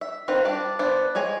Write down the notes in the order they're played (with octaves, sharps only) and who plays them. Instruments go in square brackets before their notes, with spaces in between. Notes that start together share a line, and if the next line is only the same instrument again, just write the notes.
[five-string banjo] E5
D#3 C4 F4 A#4 B4
G3 D4 D5
B3 D4 C5 D5
G#3 G#4 C#5 G#5